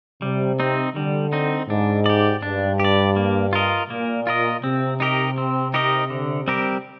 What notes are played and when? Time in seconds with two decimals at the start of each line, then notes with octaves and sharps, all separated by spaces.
0.22 C3 G3
0.60 C4 D#4
0.96 D3 G3
1.33 C4 D#4
1.69 G#2 D4
2.06 G4 D5
2.42 G2 D4
2.80 G4 D5
3.16 A#3
3.53 F4 A#4 D#5
3.90 A#2 A#3
4.27 F4 A#4 D#5
4.64 C3 C4
5.00 D#4 G4 A#4 D#5
5.38 C4
5.74 D#4 G4 A#4 D#5
6.10 D3
6.48 G3 C4 G4 A#4